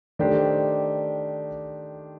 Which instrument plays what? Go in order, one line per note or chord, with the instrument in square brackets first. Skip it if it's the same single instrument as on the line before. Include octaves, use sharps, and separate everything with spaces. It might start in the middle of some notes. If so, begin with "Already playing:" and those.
[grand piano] D#3 A3 D4 G4 C5